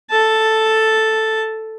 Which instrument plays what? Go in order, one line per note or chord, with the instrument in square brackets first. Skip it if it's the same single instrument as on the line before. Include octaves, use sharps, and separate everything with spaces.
[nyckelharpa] A4 A5